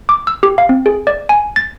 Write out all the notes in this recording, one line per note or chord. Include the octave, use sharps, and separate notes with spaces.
D6
E6
G4
F5
C4
G#4
D5
G#5
A6